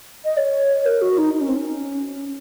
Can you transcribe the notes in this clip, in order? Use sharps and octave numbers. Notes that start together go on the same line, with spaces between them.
D#5
C#5
A#4
F#4
D#4
D#4
C#4
C4
C#4